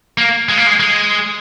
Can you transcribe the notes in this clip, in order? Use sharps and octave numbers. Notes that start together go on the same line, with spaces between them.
A#3
G#3
A#3
G#3
G#3